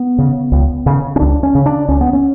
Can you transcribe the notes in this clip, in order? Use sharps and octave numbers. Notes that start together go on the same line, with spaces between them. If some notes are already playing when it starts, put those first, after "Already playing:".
Already playing: B3
C#3
C#2
C#3
C#4
C#2 D4
C#4
C#3
D4
C#2 C#4
B3
C#4